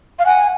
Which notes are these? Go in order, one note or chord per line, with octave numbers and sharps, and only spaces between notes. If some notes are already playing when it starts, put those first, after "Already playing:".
F5
F#5 G#5